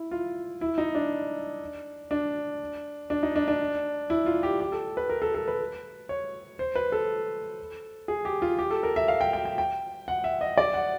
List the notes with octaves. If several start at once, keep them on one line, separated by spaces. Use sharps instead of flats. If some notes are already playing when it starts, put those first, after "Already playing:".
Already playing: E4
F4
E4
D#4
D4
D4
D4
D#4
D4
D4
E4
F4
G4
G4
A4
B4
A#4
A4
A4
B4
C#5
C5
B4
A4
G#4
G4
F4
G4
A4
A#4
E5
F5
G5
G5
G5
G5
F#5
E5
D#5
D5
F#5